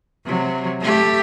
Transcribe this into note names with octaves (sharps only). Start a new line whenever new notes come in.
C3 F#3
A3 G4